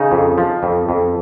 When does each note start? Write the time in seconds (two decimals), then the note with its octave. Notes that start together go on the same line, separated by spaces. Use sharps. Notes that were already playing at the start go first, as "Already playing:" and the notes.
Already playing: C#3 D#4
0.12 F2
0.38 F3
0.63 F2
0.89 F2